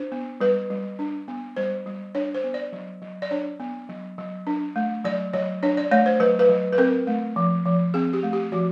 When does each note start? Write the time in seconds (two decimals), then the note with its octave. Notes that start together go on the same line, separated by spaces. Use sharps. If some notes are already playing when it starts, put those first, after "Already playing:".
Already playing: D4 C5
0.12 B3
0.41 G3 B4
0.70 G3
0.99 D4
1.28 B3
1.56 G3 C5
1.86 G3
2.15 D4 C#5
2.35 C5
2.44 B3
2.54 D5
2.73 F#3
3.02 F#3
3.22 D5
3.31 D4 C#5
3.60 B3
3.89 F#3
4.18 F#3
4.47 D4
4.76 A3
5.05 F#3 D5
5.33 F#3 C#5
5.63 D4 C#5
5.77 D5
5.91 A3 C#5
6.06 C5
6.20 F#3 B4
6.39 B4
6.49 F#3
6.73 B4
6.78 C4 A#4
7.07 A3
7.36 F3
7.65 F3
7.94 C4 G#4
8.13 G4
8.23 A3
8.33 G4
8.52 F3 F#4